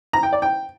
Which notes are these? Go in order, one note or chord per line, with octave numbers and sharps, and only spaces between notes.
A#5
G5
D5
G5